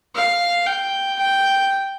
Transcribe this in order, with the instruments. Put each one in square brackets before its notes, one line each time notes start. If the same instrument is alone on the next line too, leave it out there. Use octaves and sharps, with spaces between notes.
[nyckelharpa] F5
G5
G5